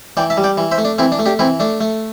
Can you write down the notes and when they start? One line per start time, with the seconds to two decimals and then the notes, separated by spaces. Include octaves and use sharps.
0.17 E3 D5 G5
0.30 E5 A5
0.37 G3
0.44 D5 G5
0.58 E3
0.71 C5 E5
0.78 A3
0.85 D4
0.98 E3 C4 E4
1.12 D4
1.19 A3
1.26 D4 G4
1.39 E3 C4 E4
1.60 A3 D4
1.80 A3